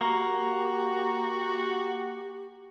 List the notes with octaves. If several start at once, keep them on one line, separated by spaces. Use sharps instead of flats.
A#3 F#4 G4